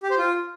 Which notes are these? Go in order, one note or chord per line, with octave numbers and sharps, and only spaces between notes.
G4
C5
F4